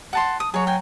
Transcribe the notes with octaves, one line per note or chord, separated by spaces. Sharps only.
F#5 A5 C6
D#6
F#3 G#4 C#5
G5 G#5